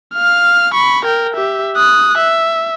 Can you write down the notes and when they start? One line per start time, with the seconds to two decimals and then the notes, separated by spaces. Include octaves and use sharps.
0.14 F5 F6
0.74 B5 C#6
1.05 A#4 G5
1.34 G4 E5
1.77 D#6 F#6
2.18 E5